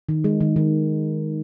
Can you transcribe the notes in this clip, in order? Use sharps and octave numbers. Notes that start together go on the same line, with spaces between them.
D#3
G#3
D#3
D#3